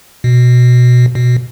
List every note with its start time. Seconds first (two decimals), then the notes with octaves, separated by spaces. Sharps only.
0.24 B2
1.15 B2